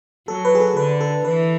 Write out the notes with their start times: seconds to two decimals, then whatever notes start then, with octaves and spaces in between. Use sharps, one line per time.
0.28 F#3 A4
0.45 B4
0.55 G#4
0.60 A4
0.77 D3 B4
1.01 A4
1.25 E3 B4